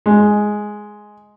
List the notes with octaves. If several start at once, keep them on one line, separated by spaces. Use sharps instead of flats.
G#3